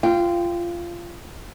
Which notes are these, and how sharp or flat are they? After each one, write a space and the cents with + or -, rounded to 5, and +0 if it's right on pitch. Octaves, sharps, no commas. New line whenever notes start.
F4 -20 G5 +0